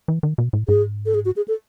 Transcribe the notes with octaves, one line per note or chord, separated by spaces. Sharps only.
E3
D#3
B2
A2
G#2 G#4
A4
G#4
F#4
G#4
A4